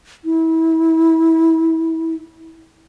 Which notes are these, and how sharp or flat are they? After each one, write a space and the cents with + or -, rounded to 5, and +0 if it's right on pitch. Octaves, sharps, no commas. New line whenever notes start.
E4 -25